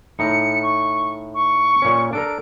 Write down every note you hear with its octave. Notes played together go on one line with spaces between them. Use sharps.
A2 D#4 C#7
C#6
C#6
A#2 C#4
D4 A4 A#4 D7